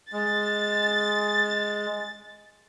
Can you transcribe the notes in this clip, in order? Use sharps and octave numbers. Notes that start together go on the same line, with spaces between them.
G#3 A6